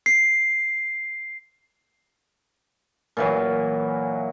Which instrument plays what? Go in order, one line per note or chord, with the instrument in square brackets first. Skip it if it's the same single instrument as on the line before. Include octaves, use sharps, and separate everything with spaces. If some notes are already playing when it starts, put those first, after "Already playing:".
[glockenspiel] C7
[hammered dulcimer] A#2 E3 F#3